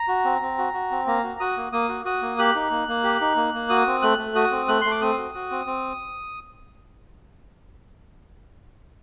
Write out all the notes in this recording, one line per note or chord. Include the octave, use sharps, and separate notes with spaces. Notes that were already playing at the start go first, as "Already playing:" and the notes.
Already playing: A#5
F#4
C4
C4
F#4
F#4
C4
A#3 A#5
F#4
F#4 D#6
A#3
A#3 D#6
F#4
F#4 D#6
A#3
G4 F#6
D#4
A#3
A#3
G4
D#4
A#3
A#3
F#4 D#6
C4
A3 F#6
A3
F#4 D#6
C4
A3 F#6
A3 C6
D6
C4 D#6
F#4
F#4
C4
C4